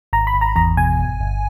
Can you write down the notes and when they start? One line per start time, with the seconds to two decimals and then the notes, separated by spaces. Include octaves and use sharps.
0.13 G#1 A#5
0.27 B5
0.34 G#1
0.41 A#5
0.56 E2 A#5
0.77 B2 G#5
0.99 G1
1.20 G1